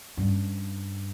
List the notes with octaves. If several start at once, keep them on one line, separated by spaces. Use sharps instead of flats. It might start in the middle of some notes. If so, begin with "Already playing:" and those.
G2 C#4